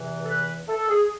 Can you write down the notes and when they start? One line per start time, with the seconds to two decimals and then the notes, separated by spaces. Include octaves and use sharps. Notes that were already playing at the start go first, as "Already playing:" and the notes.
Already playing: E2 C3 E3
0.24 A4
0.28 B4
0.68 A4
0.88 G#4